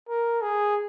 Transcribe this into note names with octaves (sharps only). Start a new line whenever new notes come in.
A#4
G#4